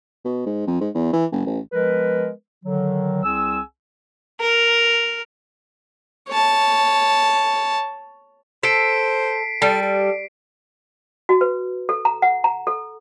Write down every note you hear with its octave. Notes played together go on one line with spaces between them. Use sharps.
B2
G#2
F2
G#2
E2
E3
F#1
A1
F3 G#3 B3 A#4 B4
D3 D#3 F#3
C2 C4 G#4 G#5 E6
A#4
C#5 A5
A4 C5 B6 C7 D7
G3 A4
A4
F#4
B4
A4
A#5
F#5
A#5
A4